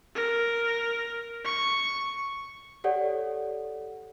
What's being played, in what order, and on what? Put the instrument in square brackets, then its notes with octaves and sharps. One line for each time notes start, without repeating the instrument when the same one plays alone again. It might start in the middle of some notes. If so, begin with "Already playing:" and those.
[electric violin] A#4
C#6
[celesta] G4 A4 C#5 D5 F#5